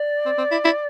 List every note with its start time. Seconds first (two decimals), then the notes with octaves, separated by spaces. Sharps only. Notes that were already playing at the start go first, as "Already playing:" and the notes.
Already playing: D5
0.26 C4
0.38 C4
0.52 E4
0.65 E4